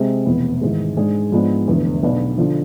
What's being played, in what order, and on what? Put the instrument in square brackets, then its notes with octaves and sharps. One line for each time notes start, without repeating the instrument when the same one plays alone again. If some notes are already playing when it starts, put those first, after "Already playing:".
Already playing: [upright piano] C3 G#3 C4
F1 E2 B2 B3
G#1 G#2 E3 G#3
G#2 G#3 D4 G#4
G#2 F3 G#3 B3 D4
F1 E2 D3
B1 B2 B3 D4
D3 F3